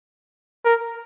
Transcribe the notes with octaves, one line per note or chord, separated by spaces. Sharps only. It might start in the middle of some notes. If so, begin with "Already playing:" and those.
A#4